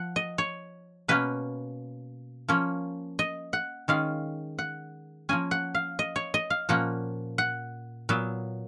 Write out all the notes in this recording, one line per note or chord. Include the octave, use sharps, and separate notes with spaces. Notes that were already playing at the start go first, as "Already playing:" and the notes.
Already playing: F3 F#5
D#5
C#5
B2 A#3 C#4 B4
F3 A#3 C#4
D#5
F#5
D#3 G#3 C#4 F5
F#5
F3 A#3 C#4 G#5
F#5
F5
D#5
C#5
D#5
F5
A#2 F3 A#3 C#4 F#5
F#5
A#2 F#3 B3